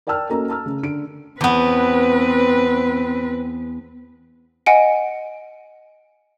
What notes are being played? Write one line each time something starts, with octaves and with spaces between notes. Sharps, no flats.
A#4 D5 G5 A5 E6 F6
A#3 C#4 F#4 A4 D#5 A#5
A5 A#5 E6 F6
C#3
D3 D7
E2 B3 C4 B4
D#5 F#5 G#5 D7